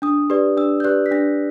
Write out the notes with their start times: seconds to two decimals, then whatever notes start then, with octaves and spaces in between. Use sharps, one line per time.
0.02 D4 D#6
0.30 G4 B4 D5
0.57 D4 E6
0.80 G6
0.84 G4 B4 D5 F#6
1.06 B6
1.11 D4 A#6